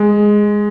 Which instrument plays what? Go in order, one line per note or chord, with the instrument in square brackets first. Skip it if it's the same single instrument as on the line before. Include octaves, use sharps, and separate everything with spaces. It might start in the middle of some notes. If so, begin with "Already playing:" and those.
Already playing: [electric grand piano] G#3